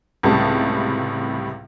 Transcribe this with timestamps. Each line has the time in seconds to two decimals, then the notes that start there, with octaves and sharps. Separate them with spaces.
0.23 C#2 A2 C3 G3 A5